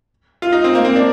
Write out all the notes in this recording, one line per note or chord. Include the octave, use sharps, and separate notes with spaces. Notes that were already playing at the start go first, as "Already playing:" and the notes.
F4
D#4
C4
A#3
C4
D4